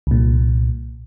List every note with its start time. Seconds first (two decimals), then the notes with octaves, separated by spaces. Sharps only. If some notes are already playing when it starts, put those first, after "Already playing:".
0.07 C2 A#2